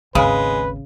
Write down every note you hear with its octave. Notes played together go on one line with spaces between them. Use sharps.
G#1 D#2 C#3 G#3 B4